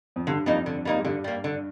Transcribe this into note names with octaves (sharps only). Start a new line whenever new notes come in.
F2
G2 D3
F2 G3 A#3 D#4
D3
G3 A#3 D#4
G#2
G2 D3
G3 A#3
D3